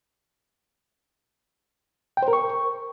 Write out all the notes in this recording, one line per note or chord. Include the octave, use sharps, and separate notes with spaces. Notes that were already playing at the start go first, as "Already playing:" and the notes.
G5
C5
A#4
C#6